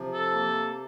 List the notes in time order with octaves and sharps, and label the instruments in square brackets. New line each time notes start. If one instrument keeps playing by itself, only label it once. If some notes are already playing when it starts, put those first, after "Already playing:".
Already playing: [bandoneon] C3 F3
[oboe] A4
[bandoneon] A#3